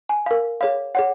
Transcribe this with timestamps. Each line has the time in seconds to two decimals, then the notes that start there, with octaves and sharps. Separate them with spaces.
0.09 G#5
0.26 A#4 F5
0.61 G#4 C#5 F5
0.95 G#4 C#5 F#5